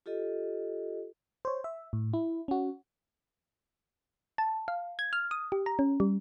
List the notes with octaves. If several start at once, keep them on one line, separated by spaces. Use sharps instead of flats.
F4 G4 A4 D#5
C5 C#5
E5
A2
E4
C#4 F#4
A5
F5
G#6
F6
D#6
G4
A#5
C#4
G3